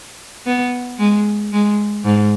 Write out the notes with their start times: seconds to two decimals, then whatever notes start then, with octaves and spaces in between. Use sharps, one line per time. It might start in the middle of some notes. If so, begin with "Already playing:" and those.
0.46 B3
0.99 G#3
1.52 G#3
2.05 G#2